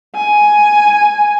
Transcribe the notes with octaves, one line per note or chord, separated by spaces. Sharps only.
G#5